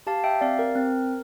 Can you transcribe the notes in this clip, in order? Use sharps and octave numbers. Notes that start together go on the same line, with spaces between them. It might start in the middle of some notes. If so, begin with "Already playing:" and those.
G4 F5 A5
E5 G5
C4 D5 F5
A#4
C4